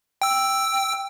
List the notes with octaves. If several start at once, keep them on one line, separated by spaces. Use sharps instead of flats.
G5 E6